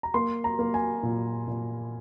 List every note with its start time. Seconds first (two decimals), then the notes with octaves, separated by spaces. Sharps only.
0.03 A#5
0.14 A#3 C6
0.44 A#5
0.59 A#3
0.74 G#5
1.03 A#2
1.48 A#2